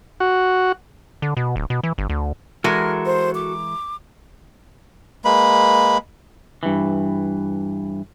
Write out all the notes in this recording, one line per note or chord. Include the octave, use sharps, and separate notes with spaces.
F#4
D3
B2
D1
B2
E3
G1
D2
E3 G#3 F#4 A4 A#4 F6
C5
D6
G#3 A#3 B4 B5
G2 E3